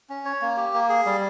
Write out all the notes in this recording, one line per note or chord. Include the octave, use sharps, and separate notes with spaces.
C#4
C#5
A#3
G4
A#3
G#4
G3